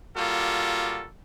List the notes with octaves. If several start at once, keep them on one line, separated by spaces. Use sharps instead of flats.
G3 A#3 F4 F#4 A4